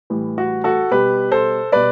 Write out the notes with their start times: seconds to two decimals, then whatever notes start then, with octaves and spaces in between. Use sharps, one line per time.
0.10 A2 E3 G3
0.38 F#4
0.64 F#4 A4
0.91 B2 G3 G4 B4
1.32 A4 C5
1.72 B2 G3 B4 D5